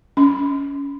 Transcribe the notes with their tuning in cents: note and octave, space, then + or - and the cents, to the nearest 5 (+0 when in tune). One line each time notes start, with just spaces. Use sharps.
C#4 +20 C6 -40